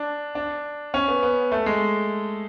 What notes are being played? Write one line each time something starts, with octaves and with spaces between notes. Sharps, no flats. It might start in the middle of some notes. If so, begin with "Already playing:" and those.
Already playing: D4
D4
C#4
B3
B3
A3
G#3